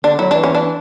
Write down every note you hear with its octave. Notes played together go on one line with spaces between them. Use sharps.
D3 D4
F#3 E4
E3 D4
C#4
D4